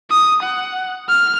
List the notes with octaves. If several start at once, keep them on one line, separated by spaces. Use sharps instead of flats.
D#6
F#5
F6